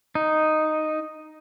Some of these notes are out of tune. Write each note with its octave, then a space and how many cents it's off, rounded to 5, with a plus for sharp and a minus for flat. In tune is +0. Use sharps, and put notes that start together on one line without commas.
D#4 -5